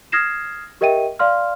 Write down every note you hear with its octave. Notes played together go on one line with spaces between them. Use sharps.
D#6 F6 G#6 A#6 C7 E7
G4 A#4 D#5 E5 G5 D#7
D5 F5 C6 F6